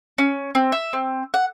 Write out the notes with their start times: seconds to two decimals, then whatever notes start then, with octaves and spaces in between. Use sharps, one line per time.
0.18 C#4
0.55 C4
0.72 E5
0.93 C4
1.34 F#5